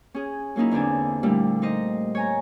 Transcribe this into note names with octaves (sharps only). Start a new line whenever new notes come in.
C#4 G#4
F#3 A#3 C#4 D#4 E4
E2 D3 C4 D4 G#5
A#2 D3 G3 A3 D4 E4
D#4 C5 D#5
C#5 G#5 A#5